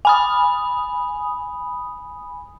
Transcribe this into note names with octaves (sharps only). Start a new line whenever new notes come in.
G#5 B5 D#6